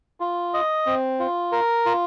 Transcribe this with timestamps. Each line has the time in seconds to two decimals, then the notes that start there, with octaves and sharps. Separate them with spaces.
0.20 F4
0.54 D#5
0.86 C4
1.20 F4
1.52 A#4
1.86 F4